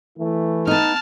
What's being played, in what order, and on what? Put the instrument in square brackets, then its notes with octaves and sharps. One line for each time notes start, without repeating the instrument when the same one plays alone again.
[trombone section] E3 A3 E4
[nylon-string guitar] B3 D#4 [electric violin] A5 F6